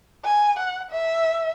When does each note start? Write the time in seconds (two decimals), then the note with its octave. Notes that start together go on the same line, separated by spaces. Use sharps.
0.24 G#5
0.59 F#5
0.91 E5